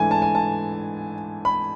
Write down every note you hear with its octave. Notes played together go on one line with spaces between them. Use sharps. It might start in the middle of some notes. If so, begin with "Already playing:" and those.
Already playing: G#2 E3 A3 D4 G#5
A5
G#5
A5
B5